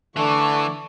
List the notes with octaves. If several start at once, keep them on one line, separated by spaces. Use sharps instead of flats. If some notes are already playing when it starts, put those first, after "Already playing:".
D3 E3 A3 C#6 D6